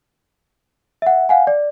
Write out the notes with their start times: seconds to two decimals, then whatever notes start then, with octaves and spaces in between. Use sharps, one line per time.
1.02 E5 F#5
1.29 F5 F#5 G#5
1.47 D5